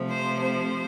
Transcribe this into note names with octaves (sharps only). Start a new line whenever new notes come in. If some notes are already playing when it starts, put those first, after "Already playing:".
Already playing: C3 F3 A3
C5
C5